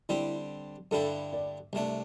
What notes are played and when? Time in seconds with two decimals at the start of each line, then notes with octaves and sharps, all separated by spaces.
0.09 D3 G3 C4 E4 G4
0.91 G2 D3 G3 E4 G4 A4
1.33 D5
1.73 C2 C3 A3 D4